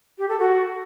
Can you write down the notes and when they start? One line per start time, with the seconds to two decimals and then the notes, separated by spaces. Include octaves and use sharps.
0.18 G4
0.29 A4
0.39 F#4